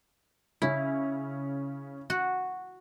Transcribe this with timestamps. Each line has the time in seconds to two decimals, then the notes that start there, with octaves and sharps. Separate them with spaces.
0.62 C#3 C#4 E4
2.10 F#4